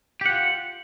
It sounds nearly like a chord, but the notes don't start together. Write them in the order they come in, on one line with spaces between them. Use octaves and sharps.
G4 F#5 F4